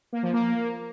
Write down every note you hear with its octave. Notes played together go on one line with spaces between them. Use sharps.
A#3
F3
A#3